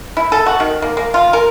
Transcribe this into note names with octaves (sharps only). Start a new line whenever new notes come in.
E4
A4
F#4
D#3
A#3
A#3
F4
A#4